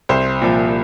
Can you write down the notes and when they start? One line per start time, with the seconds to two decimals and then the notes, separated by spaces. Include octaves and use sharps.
0.09 C2 C5
0.41 A#2 F3